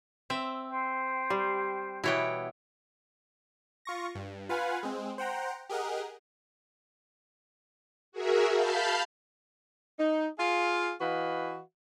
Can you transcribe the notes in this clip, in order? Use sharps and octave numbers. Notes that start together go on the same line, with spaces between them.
C4 E5
C5 G5
G3
B2 E3 B3 E4 C#5 G5
F4 C#6 A#6
G2
F4 B4 F5 F#5 G#5
G#3 C4
C5 F#5 G5 A#5
G4 G#4 A#4 D#5 F#5
F#4 G#4 A#4 E5
F5 A5 B5 F6 G6
D#4
F4 G#4 F5
E3 F#4 B4 D#5 F5